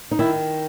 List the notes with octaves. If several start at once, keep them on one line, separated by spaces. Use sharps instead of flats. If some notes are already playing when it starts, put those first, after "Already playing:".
D#4
D#3 E4